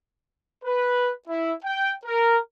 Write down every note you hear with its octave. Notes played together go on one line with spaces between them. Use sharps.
B4
E4
G5
A#4